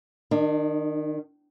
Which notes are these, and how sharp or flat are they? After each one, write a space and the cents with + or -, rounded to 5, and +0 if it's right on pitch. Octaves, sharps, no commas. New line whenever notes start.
D#3 -15 D4 +35